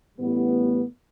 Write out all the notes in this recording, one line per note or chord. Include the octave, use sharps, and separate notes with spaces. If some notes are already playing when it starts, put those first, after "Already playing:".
A1 A2 G3 B3